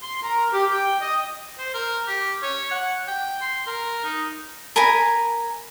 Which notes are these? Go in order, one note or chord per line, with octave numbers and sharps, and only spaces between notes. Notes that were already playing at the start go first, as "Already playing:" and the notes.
C6
A#4
G4
G5
D#5
C5
A#4
G4
C#5
F#5
G5
C6
A#4
D#4
A#4 G#5 A#5 B5